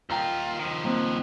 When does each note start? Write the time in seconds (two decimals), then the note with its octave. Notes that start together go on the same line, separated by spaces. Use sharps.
0.10 D#2 F4 G5 A#5 F6
0.59 D#3 F3
0.84 A#3 C4 F#6